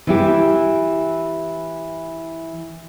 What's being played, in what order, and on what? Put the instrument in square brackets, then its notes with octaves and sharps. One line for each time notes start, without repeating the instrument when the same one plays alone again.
[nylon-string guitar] E3 E4 G4